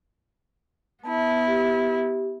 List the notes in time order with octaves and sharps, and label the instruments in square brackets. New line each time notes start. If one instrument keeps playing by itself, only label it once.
[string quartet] B3 E4 [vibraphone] A5
[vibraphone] G4